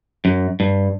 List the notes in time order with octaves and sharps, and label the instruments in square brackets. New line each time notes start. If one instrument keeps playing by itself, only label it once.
[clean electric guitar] F#2
G2